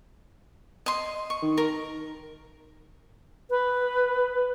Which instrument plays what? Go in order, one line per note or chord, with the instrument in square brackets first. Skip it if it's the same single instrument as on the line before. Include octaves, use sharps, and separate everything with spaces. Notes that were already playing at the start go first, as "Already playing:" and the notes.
[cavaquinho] D#5 C6
C#6
[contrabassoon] D#3
[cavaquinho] A#4
[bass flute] B4